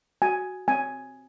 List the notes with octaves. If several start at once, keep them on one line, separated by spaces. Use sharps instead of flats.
F#4 G#5
C4 G#5